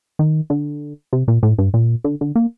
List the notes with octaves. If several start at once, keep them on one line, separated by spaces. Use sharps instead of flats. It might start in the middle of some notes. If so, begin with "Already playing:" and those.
D#3
D3
C3
A#2
A2
G2
A#2
D3
D3
A#3